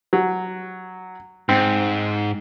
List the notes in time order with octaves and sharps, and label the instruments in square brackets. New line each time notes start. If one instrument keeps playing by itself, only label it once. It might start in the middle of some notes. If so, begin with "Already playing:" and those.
[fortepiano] F#3
[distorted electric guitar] G#2 [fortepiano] C4